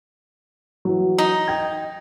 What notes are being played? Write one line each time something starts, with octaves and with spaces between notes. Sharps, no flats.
E3 F#3
D#4
G5 G#6